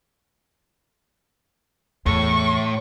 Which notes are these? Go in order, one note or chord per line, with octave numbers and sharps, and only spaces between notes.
E2 A2 C#6